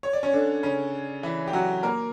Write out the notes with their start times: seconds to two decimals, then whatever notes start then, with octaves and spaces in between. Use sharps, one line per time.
0.03 C#5
0.13 D5
0.23 C#4 C#5
0.33 D3 D4
0.63 C#3 C#4
1.23 E3 E4
1.47 G4
1.53 F#3 F#4
1.83 A#3 A#4